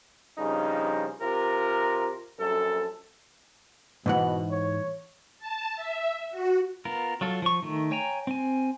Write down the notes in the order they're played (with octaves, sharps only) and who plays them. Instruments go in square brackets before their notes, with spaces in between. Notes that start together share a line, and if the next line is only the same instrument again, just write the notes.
[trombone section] G2 C#3 F3 D#4
C3 F4 A#4
A#1 F#2 A4
[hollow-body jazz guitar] G#2 E3 F#5 [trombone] B2
[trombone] C#5
[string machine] A5
E5
F#4
[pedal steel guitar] B3 F4 A#4
F#3 F4 A4
F3 C#6
D#3 A3
C#5 G5 G#5 A#5
C4 G#5